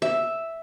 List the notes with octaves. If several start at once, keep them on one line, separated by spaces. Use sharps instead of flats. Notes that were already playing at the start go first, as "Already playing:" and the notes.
E5